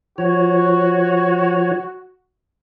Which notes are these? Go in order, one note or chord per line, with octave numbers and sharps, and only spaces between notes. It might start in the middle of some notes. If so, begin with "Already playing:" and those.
F3 F#4 C#5